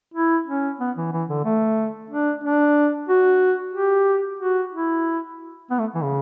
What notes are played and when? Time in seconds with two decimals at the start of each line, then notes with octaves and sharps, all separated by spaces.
0.14 E4
0.47 C#4
0.80 B3
0.97 E3
1.13 E3
1.29 D3
1.45 A3
2.10 D4
2.44 D4
3.09 F#4
3.74 G4
4.40 F#4
4.73 E4
5.71 B3
5.79 A3
5.95 E3
6.04 C#3